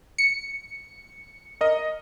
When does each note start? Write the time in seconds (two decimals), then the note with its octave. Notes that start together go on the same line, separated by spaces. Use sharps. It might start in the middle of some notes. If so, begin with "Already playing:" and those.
0.18 C#7
1.61 A#4 D#5